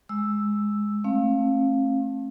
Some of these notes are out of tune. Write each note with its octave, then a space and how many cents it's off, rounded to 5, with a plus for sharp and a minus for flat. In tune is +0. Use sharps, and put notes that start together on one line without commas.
G#3 +0 E6 +0
A3 +0 C4 +45 F5 +0